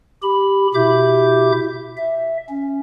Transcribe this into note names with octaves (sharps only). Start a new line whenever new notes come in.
G4 B5
B2 E4 G4 E5 D6 G6
E5
C#4